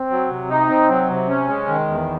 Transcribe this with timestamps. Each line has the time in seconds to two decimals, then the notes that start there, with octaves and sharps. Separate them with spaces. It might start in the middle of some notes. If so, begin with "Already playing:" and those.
Already playing: C4
0.10 F#3
0.29 C3
0.50 D#4
0.69 C4
0.89 F#3
1.09 C3
1.28 C#4
1.48 G#3
1.68 D#3
1.88 E2